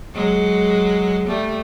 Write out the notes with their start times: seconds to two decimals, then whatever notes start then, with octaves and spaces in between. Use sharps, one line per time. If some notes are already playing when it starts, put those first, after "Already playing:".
0.14 F#3 G#3
1.28 G3 A3